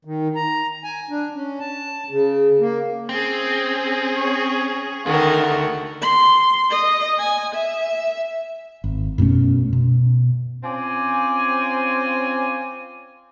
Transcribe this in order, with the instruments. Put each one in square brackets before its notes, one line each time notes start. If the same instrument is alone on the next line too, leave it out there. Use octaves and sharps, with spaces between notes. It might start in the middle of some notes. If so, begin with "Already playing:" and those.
[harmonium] D#3
A#5
G#5
D4
C#4
A5
C#3
A#3
[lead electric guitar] C4 [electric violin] C#4 G#4
[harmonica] C#5 C#6
[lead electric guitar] D2 [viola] D#3 A#4 [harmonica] A4 F#5 C#6
[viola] C6
D#5
G#5
E5
[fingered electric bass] G#1
F#2 B2 A3 C#4
B2
[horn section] C4 C#4 F4 D5 G#5